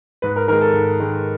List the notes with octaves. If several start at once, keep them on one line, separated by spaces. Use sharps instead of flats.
G#2 B4
A#4
D#3 G#3 A#4
A4
G#2
D#3 G#3